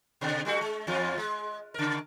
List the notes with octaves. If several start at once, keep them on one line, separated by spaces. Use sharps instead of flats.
B2 D3
G3 A3 F#4
G#3
E2 F3 F4
G#3
C#3 A#4